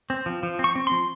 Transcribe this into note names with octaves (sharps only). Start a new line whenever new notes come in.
C4
F3
F3
C4
C#6
C4
F3 C6